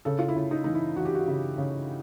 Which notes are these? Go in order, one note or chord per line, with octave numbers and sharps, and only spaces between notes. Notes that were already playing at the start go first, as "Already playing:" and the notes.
C#3 A4
F4
E4
C#3
D#4
E3 D#4
E4
E3 F#4
G4
F#4
C#3
C#3